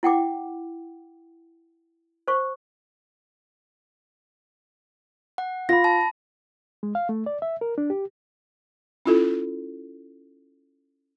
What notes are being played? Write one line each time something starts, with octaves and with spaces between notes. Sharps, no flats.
E4 F#5 G5 D6
C5 C#6
F#5
F4 B5 A#6
A5
G#3
F5
A3
D5
E5
A#4
D4
G4
C#4 E4 F4 A4